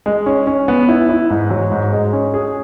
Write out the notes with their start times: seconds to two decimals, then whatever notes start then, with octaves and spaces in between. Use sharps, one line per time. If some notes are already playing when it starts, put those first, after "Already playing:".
0.06 G#3
0.26 C#4
0.47 C#4
0.68 B3
0.89 E4
1.09 E4
1.30 G#2
1.50 F#3
1.72 G#2
1.93 G#3
2.13 C#4
2.34 G#4